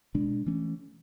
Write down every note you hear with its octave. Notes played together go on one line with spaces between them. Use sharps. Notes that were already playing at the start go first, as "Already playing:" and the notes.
B2 G#3 D4
E3 A3 C#4